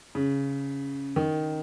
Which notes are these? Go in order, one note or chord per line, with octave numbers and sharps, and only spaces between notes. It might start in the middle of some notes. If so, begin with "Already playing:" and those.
C#3
D#3